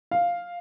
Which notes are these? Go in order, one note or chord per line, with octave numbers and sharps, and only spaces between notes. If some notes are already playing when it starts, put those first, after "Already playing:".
F5